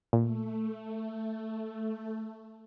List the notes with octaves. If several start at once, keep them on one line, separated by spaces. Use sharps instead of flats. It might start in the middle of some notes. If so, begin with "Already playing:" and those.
A#2 A3